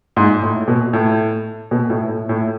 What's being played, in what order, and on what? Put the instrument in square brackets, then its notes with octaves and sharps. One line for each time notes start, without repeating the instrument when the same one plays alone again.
[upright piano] G#2
A2
B2
A2
B2
A2
A2
A2